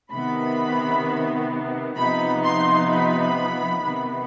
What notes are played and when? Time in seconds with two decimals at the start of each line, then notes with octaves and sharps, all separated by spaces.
0.11 C3 D#3 B3 B5
1.96 C3 F3 B3 D#4 B5
2.43 C6
2.89 B5
3.82 C3 D#3 B3